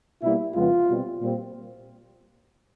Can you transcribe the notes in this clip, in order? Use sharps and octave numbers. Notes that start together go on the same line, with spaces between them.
B2 G3 A#3 E4
F2 C#3 F3 G#3 B3 F4
B2 G3 C4
A#2 G3 C4